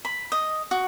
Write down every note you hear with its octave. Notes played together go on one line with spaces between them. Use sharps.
B5
D#5
F#4